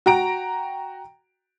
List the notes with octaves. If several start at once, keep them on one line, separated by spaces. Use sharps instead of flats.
F#4 G5 A#5 D7